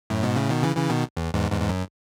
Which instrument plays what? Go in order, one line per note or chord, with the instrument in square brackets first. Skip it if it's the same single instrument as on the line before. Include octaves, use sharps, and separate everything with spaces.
[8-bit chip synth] F#2 A2
G#2 B2
A2 C#3
B2 D#3
C#3 E3
C#3 E3
B2 D#3
E2
E2 G#2
E2 G#2
G#2
F#2